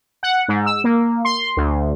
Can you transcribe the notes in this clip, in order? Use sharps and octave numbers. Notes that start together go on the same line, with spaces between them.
F#5
G#2
E6
A#3
C6
D2